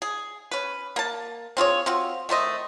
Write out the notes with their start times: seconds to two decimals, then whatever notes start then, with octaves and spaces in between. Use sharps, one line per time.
0.02 G#4
0.51 C#4 B4
0.96 A#3 A5
1.57 C4 F4 G#4 C#5
1.86 C4 F4 F#4
2.29 D#3 A3 C5 D#5